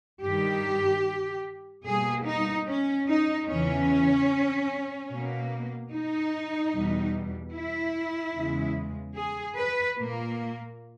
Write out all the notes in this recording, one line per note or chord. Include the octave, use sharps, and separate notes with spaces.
G2 D#3 G3 G4
B2 G3 A#3 G#4
D#4
C#4
D#4
E2 C#3 E3 C#4
B2 A#3
D#4
E2 B2 G3
E4
E2 C#3 G#3
G#4
B4
A#2 A#3